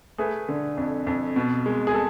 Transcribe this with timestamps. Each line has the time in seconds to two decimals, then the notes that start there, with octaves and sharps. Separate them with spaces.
0.18 A3 G#4 B4
0.49 D3
0.77 F2
1.07 F2
1.36 B2
1.66 G#3
1.87 G#4
1.94 G#3 A4